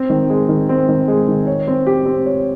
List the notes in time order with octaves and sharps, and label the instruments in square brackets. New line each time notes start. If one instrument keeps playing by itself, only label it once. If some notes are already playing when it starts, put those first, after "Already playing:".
Already playing: [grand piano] C4
D#3
G#3
D#3
C4
D#3
G#3
D#3
C#5
C4
G4
C4
C#5